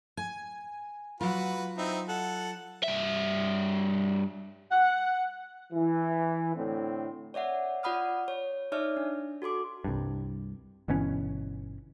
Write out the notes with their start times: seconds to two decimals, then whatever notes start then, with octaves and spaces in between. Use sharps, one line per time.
0.17 G#5
1.21 F#3 F4 F#4 B4
1.77 C4 D#4 E4
2.09 A4 F#5
2.83 G2 E5
4.71 F#5
5.73 E3
6.55 A2 D3 C4
7.34 C#5 D5 E5 F#5
7.83 F4 D5 F#5 B5 D#6 F6
8.28 C#5
8.72 D#4 C#5 D5 E5 F6
8.97 D4
9.42 F#4 A4 C6 D6
9.84 C2 G2
10.88 G1 B2 E3 C#4